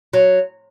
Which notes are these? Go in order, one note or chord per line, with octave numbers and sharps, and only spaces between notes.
F#3